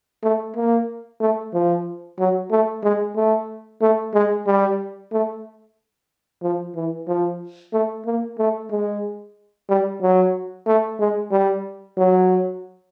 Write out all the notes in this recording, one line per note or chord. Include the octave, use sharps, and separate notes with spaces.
A3
A#3
A3
F3
F#3
A3
G#3
A3
A3
G#3
G3
A3
F3
E3
F3
A3
A#3
A3
G#3
G3
F#3
A3
G#3
G3
F#3